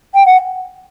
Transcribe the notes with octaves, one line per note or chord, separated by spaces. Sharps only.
G5
F#5